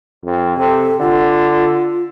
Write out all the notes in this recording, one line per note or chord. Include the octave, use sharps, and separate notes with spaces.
F2
C3 A4
D3 F4